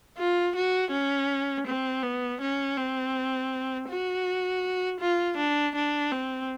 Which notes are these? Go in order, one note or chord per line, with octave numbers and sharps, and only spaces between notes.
F4
F#4
C#4
C4
B3
C#4
C4
F#4
F4
D4
D4
C4